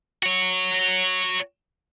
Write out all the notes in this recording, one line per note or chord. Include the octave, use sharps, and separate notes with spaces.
F#4 C#5